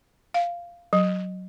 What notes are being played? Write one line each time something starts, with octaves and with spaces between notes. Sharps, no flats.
F5
F#3